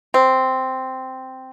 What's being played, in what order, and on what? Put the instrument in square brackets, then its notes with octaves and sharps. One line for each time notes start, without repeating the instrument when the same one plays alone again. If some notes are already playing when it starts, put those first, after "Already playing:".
[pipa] C4